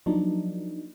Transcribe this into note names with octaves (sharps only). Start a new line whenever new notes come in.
F3 F#3 A#3 D4 D#4